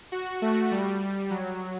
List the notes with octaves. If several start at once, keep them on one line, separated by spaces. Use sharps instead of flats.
F#4
A3
G3
F#3